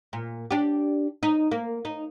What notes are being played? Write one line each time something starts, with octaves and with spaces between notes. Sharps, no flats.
A#2
D4 G4
D#4
A#3
D#4